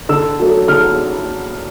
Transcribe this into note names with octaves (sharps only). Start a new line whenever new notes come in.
D3 E6
F#3 A3
D3 F6